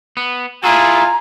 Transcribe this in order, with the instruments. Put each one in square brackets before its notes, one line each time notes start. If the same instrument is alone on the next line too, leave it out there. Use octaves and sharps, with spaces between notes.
[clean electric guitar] B3
[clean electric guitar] E4 G#4 A4 [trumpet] F4 [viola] G#5 [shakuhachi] A#5